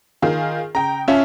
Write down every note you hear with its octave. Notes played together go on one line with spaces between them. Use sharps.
D#3 F4 G#4
C#3 G5 A#5
C#4 F4 E5 A5